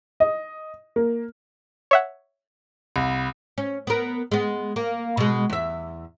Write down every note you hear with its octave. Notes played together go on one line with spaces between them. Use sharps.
D#5
A#3
C#5 E5 F#5
C2
C#4
B3 A#4
G#3 B3
A#3
B2 G#3
E2 E5